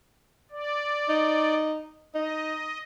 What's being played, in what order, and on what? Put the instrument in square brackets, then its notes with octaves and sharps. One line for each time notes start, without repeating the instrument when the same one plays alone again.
[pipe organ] D5
[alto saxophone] D#4
[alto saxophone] D#4 [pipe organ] D#5